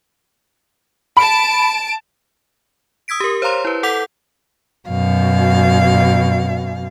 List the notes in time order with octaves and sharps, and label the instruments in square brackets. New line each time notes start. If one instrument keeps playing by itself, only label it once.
[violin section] A5 D7 [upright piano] B5
[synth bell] D#6 E6 G#6 B6 D7
G4 A#4
C5 C#5 F5 A#5 C6
E4 B4
A4 F#5 D6 G6 B6 F7
[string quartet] F#2 B2 F5